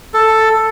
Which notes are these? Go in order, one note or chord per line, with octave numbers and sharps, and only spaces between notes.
A4